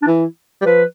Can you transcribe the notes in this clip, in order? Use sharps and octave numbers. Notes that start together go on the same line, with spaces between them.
D4
E3 E4
G3
F3 B4